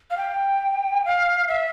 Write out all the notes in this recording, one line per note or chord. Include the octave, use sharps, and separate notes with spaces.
F5
G5
F5
E5